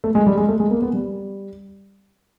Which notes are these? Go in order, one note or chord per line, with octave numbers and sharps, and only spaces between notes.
A3
G#3
G3
G#3
A3
G#3
A#3
B3
G3